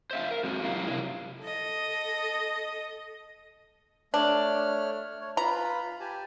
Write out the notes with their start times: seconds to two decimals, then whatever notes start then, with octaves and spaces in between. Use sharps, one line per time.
0.11 C5 E5 F5
0.31 A#4
0.44 F#3 G#3 C4 F#4
0.64 F#2 E4 G4 F5 A#5
0.86 C3 F#3 E4 A#4
1.41 A4 D#5
4.14 A3 D4 C#5 F6
5.21 C#5
5.37 F4 B4 A#5 B5
6.00 G4 G#5 A5